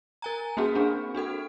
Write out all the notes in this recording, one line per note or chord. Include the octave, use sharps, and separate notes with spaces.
A#4 G#5 A#5
A#3 C#4 F#4 G#4
C4 D4 G#4
D4 F#4 A4 F#5